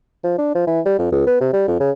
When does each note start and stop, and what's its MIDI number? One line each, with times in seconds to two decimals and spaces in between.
0.24 0.37 53
0.38 0.53 62
0.55 0.65 53
0.67 0.80 52
0.85 0.96 55
0.98 1.07 41
1.12 1.24 37
1.27 1.35 59
1.40 1.52 48
1.53 1.63 55
1.68 1.77 41
1.80 1.91 49